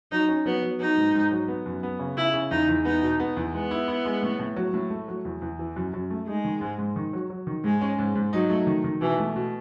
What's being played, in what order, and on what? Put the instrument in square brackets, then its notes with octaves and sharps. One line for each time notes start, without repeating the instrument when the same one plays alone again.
[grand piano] F#3 [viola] D#4
[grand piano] C#4
[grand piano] F#3 [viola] B3
[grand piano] F#3
[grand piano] F#3 [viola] D#4
[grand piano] G#2
G#2
F#3
B3
F#2
B3
C#3
[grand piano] C#3 [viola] E4
[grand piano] C#3
[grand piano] E2 [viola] D#4
[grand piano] E2
[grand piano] B3 [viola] D#4
[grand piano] B2
B3
E2
[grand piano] G#3 [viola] B3
[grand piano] E4
E4
G#3
A2
A2
F#3
A2
A3
F#3
E2
E2
E3
F#2
F#2
A3
[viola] G#3 [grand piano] D#4
[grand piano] D#3
G#2
G#2
D#3
F#3
F#3
D#3
[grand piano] G#2 [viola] G#3
[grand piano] C#4
G#2
G#2
[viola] F#3 [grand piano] D#4
[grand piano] A3
D#3
D#3
[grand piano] B2 [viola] E3
[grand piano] A3
B2